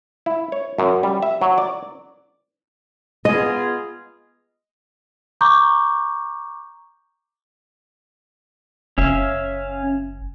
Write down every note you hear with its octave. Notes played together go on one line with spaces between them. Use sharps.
E4
C#5
F#2
G3
E5
F#3
D5
B3 F4 G#4 D#5
A#5 C#6 D6 G6
F#1 C#4 E5 F5